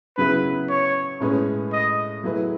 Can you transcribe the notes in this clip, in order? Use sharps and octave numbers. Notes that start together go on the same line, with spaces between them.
C#3 F#3 B3 E4 G#4 B4
C#5
A2 G#3 C#4 G#4 B4
D#5
F#3 A3 E4 G#4 B4